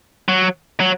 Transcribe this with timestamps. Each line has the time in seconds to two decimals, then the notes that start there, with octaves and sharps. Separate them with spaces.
0.29 F#3
0.80 F#3